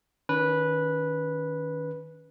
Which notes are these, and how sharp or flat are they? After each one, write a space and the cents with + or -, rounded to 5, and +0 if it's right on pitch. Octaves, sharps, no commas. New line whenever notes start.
D#3 +0 C#4 +35 B4 -10